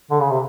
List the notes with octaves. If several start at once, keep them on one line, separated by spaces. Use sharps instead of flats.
D3
C#3
C3